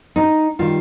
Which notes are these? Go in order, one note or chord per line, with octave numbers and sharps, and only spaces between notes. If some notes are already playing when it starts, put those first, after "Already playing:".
D#4
D#3 G3 F4